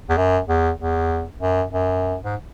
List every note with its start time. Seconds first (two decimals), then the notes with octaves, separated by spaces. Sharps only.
0.09 E2
0.17 F#2
0.48 E2
0.80 E2
1.42 F#2
1.73 F#2
2.24 G#2